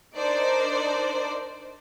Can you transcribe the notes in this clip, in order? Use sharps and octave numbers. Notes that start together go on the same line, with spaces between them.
D4 D#4 A#4 C5 D5